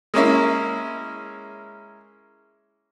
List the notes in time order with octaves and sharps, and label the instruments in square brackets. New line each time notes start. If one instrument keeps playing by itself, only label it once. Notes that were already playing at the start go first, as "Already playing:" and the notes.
[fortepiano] G#3 A#3 C#4 E4